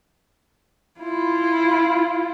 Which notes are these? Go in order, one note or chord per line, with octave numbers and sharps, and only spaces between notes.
E4 F4